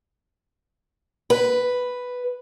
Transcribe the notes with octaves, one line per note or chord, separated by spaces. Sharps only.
B4